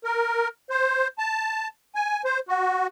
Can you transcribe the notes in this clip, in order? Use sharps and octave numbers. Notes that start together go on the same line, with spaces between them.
A#4
C5
A5
G#5
C5
F#4